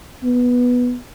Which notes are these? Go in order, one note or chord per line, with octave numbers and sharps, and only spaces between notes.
B3